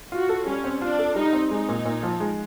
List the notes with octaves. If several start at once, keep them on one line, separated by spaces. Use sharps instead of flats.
F4 F#4
A4
G3 C#4
C4
D4 F4
A4
G3 D#4
C4
G#3 D#4
A#2
A#2
F3
G#3